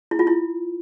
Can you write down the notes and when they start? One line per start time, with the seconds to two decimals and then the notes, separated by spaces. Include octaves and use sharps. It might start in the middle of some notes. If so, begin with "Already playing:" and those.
0.11 E4
0.19 F4
0.27 E4